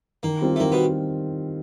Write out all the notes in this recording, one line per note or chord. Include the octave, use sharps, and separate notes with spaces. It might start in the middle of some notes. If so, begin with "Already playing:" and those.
D#3 A#3
G3 C4 F4
A3
D#3 A#3
B2 B3